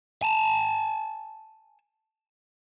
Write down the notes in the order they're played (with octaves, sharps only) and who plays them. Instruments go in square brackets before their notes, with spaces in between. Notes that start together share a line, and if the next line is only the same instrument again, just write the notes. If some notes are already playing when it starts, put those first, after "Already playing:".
[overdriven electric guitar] G#5 A5